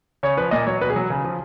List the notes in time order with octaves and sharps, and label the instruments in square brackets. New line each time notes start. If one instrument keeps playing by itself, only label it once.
[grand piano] C#3 C#5
F3 B4
A#2 D#5
F#3 C#5
B2 B4
G#4
F#3
C#3
F3